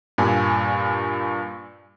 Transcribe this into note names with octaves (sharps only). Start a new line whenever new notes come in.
G2 A#2 G#5